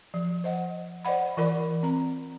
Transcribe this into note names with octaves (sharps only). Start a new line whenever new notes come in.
F3
C5 D#5 F#5
C5 D5 D#5 F#5 B5
E3 F4 A#4 D5 B5
C4 A#5